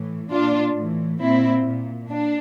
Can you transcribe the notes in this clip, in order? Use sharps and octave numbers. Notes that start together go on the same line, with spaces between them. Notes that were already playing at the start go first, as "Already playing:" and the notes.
Already playing: A2 E3
A#2 D4 F4
A2 E3
A#2 C4 E4
A#2
D4